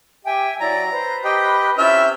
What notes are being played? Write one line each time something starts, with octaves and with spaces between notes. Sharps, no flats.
G4 E5 G5 G#5
F#3 E4 D5 A#5
B4 C5
G4 D#5 G5
C3 C#4 E4 F4 E5 F6 G6